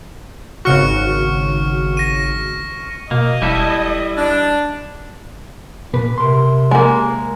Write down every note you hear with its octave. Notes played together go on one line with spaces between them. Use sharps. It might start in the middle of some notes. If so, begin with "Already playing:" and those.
G#1 C#3 F#4 C#6 F6 C#7
A#6 D#7
B2 A#3 D#5
E1 G3 E4 A4
D4
A#2 B4
C3 A#4 C6
G#3 A#3